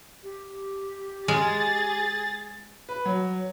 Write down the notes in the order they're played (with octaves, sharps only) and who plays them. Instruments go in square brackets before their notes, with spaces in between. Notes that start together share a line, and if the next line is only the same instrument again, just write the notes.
[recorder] G4
[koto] G#3 [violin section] G#4 A6
[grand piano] B4
F#3